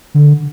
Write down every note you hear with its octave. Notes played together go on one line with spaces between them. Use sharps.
D3